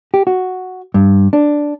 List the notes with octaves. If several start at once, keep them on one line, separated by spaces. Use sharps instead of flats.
G4
F#4
G2
D4